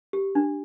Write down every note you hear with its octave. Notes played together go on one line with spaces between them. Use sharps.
G4
D4